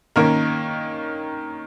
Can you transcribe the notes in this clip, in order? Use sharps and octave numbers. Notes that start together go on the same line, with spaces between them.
D#3 A#3 C#4 A#4